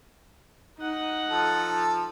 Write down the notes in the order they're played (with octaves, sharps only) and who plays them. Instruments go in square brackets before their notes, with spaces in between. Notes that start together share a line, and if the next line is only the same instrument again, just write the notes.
[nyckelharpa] D#4 F#5
[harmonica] F3 A4 A5